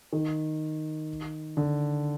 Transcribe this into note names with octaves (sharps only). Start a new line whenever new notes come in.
D#3
D3